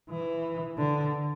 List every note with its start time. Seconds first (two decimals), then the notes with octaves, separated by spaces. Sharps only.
0.10 E3
0.78 D3